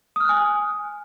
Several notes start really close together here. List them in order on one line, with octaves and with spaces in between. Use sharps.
D#6 F6 F#6 G#5